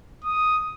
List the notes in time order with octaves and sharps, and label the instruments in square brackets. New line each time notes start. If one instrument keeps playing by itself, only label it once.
[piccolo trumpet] D#6